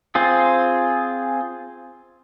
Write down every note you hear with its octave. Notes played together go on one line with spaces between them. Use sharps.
C4 F4 G#4